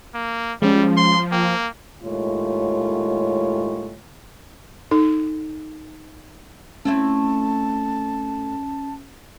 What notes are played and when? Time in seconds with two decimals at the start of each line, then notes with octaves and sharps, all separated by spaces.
0.15 A#3
0.62 F3 G3 G#3 C#4
0.97 C6
1.32 A#3 G5
2.03 D#2 A2 G#3 A3 F4 C#5
4.91 D#4 A4
6.85 A3 C4 C#4 E4 A5